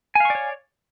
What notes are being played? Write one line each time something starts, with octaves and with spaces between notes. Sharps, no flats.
C#5 D5 F5 G#5 C#6